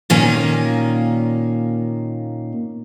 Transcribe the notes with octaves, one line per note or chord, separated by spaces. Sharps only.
A#2 D#3 A#3 C#4 G#5